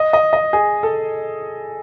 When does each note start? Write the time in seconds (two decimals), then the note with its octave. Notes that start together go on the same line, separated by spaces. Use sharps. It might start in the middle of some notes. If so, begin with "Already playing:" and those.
Already playing: D#5
0.13 D#5
0.33 D#5
0.53 G#4
0.83 A4